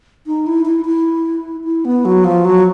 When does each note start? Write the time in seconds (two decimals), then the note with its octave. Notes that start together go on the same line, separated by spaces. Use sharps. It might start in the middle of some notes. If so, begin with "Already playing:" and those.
0.27 D#4
0.47 E4
0.66 E4
0.85 E4
1.65 E4
1.85 B3
2.05 F#3
2.24 F3
2.45 F#3